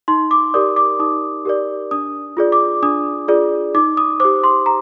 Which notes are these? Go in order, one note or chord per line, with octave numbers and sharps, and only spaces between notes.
D#4 C6
D6
G4 A#4 D5 D#6
D6
D#4 D#6
G4 A#4 D5
D4 D#6
F4 G#4 D5
D6
D4 D#6
F4 G#4 D5
D#4 D6
D#6
G4 C5 D6
C6
A#5